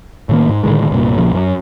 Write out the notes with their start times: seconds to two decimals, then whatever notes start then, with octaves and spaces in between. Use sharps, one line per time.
0.29 A2 D#3 A#3
0.49 G#2
0.63 A2 D3 D#3 G#3
0.90 C2 G2 A#2
1.18 A#1 A#2 C#3 F3
1.32 F#2